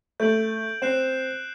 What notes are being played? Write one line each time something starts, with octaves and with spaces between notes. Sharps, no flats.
A3 G6 D7 F#7
C4 F#6 C7 E7